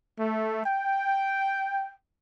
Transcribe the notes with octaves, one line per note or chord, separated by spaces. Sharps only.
A3
G5